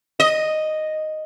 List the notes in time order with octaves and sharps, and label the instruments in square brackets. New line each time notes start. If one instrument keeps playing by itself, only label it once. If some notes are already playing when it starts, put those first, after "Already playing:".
[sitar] D#5